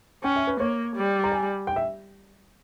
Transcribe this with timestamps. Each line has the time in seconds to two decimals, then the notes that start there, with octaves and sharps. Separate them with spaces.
0.23 C#4 G5
0.36 E5
0.47 B4
0.60 A#3 C#5
0.96 G3
1.24 A#5
1.31 G#5
1.67 G5
1.76 E5